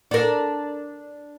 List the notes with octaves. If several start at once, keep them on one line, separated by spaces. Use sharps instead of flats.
D4 A#4